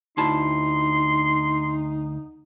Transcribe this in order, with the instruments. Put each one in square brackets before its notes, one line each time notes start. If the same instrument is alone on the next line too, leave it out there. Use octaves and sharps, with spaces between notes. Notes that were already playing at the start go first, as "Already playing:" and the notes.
[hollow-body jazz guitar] D2 E4 A5 [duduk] D#4 [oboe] C6